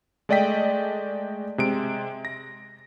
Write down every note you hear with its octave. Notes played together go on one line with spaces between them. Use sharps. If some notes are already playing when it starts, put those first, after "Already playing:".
G#3 A3 D5 D#5 G5 B6
C3 G#3 D7
A#6